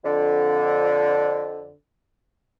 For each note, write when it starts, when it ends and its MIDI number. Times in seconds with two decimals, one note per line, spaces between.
0.04 1.73 41
0.04 1.73 50